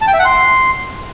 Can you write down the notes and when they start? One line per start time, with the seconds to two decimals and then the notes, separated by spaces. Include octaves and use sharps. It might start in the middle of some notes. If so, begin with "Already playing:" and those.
0.01 A5
0.07 G5
0.13 E5
0.19 F#5
0.25 C6